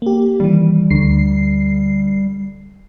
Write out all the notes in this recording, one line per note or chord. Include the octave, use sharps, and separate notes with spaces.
A#3 G4
D#3 E3 G3
D2 D3 C7